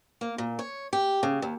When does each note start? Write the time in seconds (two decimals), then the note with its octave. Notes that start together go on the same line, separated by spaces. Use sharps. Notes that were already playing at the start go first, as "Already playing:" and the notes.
0.21 A#3
0.38 A#2
0.59 C#5
0.93 G4
1.23 C#3
1.42 D#2